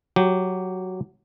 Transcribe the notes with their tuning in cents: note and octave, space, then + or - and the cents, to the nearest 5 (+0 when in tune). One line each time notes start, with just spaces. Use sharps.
F#3 +0 G4 -10